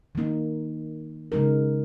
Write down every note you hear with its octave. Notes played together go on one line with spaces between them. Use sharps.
D#3 A#3 D#4
C#3 G#3 D#4 A#4